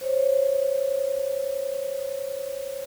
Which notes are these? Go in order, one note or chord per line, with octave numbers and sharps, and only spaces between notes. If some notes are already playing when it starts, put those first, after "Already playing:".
C5 C#5